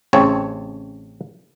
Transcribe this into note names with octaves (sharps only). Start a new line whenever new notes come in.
A1 C#3 C4 C#5 A5